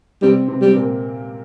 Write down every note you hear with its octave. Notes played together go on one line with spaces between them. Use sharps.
C3 G3 C4
C3 C4
G3 C4
A#2 A#3